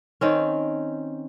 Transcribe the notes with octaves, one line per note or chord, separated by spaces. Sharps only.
D#3 C4 C#4